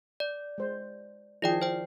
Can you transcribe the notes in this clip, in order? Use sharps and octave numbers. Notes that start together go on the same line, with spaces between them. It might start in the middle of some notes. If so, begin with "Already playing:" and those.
D5
G#3 C5
D#3 F3 E4 G#4 D5 G5
C5 G5